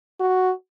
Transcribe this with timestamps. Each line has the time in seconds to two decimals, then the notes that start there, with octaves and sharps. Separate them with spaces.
0.20 F#4